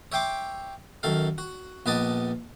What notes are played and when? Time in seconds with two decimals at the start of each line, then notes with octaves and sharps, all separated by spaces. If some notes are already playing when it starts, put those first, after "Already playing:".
0.12 C#5 E5 G5 C6 D6
1.03 F#2 D#3 A4 F5
1.38 F#4
1.86 A#1 B3 B4 D5 D#5 A5